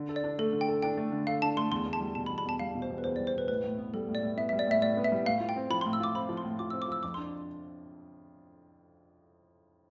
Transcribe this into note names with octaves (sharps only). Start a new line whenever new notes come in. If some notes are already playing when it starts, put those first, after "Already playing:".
Already playing: D3
A4
D5
D4
A3 A4
D3
G5
A4
D4 G5
A3
D3
A4 F5
D4 A5
A3 C6
E2 C6
E2
A5
G3
B2 A5
B5
E2
B5
E2 A5
G3 F5
B2
C5
E2
B4
E2 C5
D5
G3
C5
B2 B4
A2 B4
A2
B3
G3 A4
A2
D5
A2
B3 E5
E5
G3
D5
A2 E5
A2 D5
B3
E5
G3
A2 F5
F4
G5
C4
F3 B5
C6
A2
E6
F4 D6
C4 B5
F3
C6
A2
F4 D6
E6
C4
D6
F3 E6
F2 D6
C6
D4